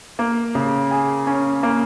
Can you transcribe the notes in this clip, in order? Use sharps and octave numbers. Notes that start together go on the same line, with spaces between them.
A#3
C#3
G#4
C#4
A#3